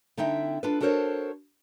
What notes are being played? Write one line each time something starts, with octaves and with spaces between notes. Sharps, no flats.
D3 C4 D#4 E4 E5 G5
D4 F4 A4 B4
D4 F#4 A4 A#4 C5 C#5